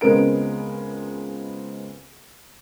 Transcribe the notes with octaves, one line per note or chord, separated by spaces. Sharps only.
C#2 G#3 B3 C4 A#4 D7